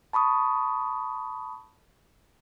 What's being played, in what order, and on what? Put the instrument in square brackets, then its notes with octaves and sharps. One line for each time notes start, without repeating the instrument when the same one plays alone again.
[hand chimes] A5 B5 C#6 D#6